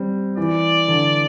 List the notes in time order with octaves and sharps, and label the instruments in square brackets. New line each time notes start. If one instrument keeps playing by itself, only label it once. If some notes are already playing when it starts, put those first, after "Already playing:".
Already playing: [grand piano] G3 C4
[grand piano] E3 [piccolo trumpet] D5
[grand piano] D3